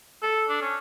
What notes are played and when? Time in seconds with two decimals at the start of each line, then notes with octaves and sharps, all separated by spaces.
0.23 A4
0.49 D4
0.62 C#4